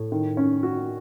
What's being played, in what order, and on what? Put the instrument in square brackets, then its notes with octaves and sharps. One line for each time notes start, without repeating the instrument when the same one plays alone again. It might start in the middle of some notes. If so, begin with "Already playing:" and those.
Already playing: [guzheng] A2
[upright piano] D#3
C#4
F#4